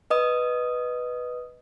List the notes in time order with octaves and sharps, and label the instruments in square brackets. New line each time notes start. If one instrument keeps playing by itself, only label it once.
[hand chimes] B4 D#5 D#6